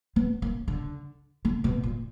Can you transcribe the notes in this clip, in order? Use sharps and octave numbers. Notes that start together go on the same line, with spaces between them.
B3
A#3
D3
D3
B2
A#2